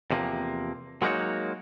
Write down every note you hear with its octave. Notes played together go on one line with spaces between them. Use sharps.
E2 C3 F3 A#3
F#3 G#3 A#3 D#4 F#4 C#5